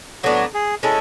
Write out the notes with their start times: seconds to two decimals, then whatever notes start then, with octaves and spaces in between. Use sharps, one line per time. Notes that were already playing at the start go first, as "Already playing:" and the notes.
0.23 A2 F#3 B3 D4 F#4
0.54 G#4
0.83 G#3 C#4 E4 A4